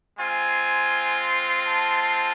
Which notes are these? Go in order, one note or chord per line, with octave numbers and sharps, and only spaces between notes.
G#3 C4 F4 G#5
A5